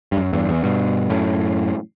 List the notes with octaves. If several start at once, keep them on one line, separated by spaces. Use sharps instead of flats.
G2
F#2
E2 G2
E2
G2 B2
F#2 A2